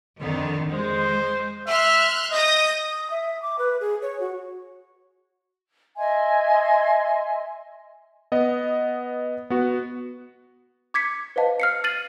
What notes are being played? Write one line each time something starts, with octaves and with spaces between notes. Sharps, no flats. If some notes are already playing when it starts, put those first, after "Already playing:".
F2 D3 D#3
G#3 C5
E5 C6 F6 F#6
D#5 D#6 G6 A#6
D#6
E5
D6
B4
G#4
C#5
F#4
D#5 E5 G#5 C6
B3 D#5
B3 F#4
D6 G#6 B6 C#7
B4 C5 D#5 F5 A5
F6 C7 C#7
F6 A6 C7 D#7 F#7